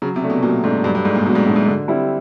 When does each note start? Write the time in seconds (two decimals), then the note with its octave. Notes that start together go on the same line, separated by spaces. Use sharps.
0.02 C#3 F#3
0.16 C3
0.22 A3 D4
0.30 B2
0.43 A#2 F#3
0.63 G#2 A3 D4
0.84 G2 F#3
0.95 G2
1.04 G#2 A3
1.10 D4
1.15 A#2
1.25 B2 F#3
1.35 G#2
1.46 A2 A3 D4
1.56 G#2
1.66 D3
1.88 G3 C4 E4